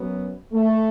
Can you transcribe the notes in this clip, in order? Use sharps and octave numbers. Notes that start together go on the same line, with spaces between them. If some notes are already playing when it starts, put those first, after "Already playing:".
Already playing: F#2 F#3 B3
A3